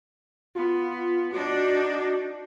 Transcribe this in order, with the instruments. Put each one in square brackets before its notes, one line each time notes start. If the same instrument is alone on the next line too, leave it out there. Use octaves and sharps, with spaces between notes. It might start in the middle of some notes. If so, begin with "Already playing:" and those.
[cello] B3 [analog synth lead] F4
[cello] D4 D#4 [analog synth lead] F#4